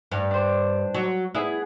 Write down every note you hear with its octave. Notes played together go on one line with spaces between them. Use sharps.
G2
D4 C5
F#3
B3 E4 G#4